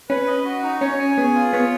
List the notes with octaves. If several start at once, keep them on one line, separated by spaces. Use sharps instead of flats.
C#4 B4
D#5
F#4
D#4
C#4 C#5
G#5
B3 G#4
F4
B3 C#5